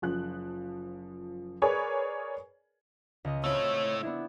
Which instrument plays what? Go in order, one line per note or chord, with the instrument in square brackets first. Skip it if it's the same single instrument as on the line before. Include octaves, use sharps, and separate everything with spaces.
[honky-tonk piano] F#1 F3 F#6
G#4 A#4 B4 C#5 D5 G#5
[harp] C#2 D#5
[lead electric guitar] A3 E4 [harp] C4 F4 [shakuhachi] C#5
[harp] B3 D4 E4